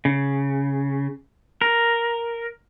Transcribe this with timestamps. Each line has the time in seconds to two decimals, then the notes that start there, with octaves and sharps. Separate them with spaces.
0.05 C#3
1.62 A#4